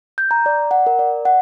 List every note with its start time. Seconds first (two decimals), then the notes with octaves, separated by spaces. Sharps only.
0.18 G6
0.31 A#5
0.46 D5
0.71 F#5
0.87 A#4
0.99 D5
1.25 F#5